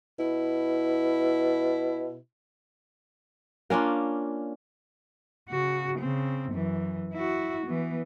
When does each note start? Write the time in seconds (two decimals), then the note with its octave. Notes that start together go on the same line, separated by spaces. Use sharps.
0.19 B2 E4
3.70 A#3 C#4 D4 F4
5.50 C#3 F#4
5.99 C#3 C4
6.52 F#2 E3
7.13 E4 F#4
7.66 E3 B3